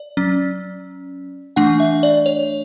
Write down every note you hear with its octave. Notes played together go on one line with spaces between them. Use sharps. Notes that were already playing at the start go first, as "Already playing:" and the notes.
Already playing: D5
F#3 C#4
E3 A3 D4 F#5
E5
D5
C#5